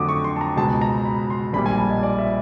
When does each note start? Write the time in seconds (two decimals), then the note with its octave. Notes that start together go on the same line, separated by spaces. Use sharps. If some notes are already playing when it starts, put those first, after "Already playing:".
Already playing: F2 D3 F#3 A3 D6 D#6
0.09 C#6
0.24 C6
0.36 A5
0.41 A#5
0.57 C#2 B2 G#3 A5
0.81 A#5
1.05 B5
1.30 C6
1.53 A#1 A#2 G3 B5
1.66 G#5
1.78 A5
1.90 D#5
2.03 D5
2.19 E5